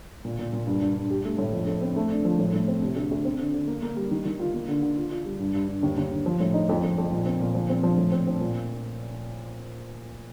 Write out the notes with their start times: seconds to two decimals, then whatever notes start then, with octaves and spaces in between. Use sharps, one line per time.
0.25 A#2
0.39 A#2
0.53 A#2
0.67 G2
0.81 G2
0.96 G2
1.10 G4
1.25 A3
1.38 A2
1.53 F2
1.67 A3
1.81 C4
1.96 A3
2.10 D4
2.25 F3
2.39 A2
2.53 A2
2.68 C4
2.82 C3
2.96 D2
3.11 D2
3.25 C4
3.39 D3
3.54 D3
3.67 A#3
3.82 A#3
3.96 G3
4.11 D#3
4.25 D#3
4.39 F4
4.54 A#3
4.68 D3
4.82 D3
4.96 F4
5.11 F4
5.25 G3
5.39 G2
5.54 G2
5.68 G2
5.83 D#2
5.97 D#2
6.11 D3
6.26 F3
6.40 A2
6.54 D#4
6.69 F2
6.83 F2
6.98 F2
7.12 A#2
7.26 C4
7.40 A#2
7.55 F3
7.69 C4
7.83 F3
7.97 A2
8.12 C4
8.27 C4
8.41 A#2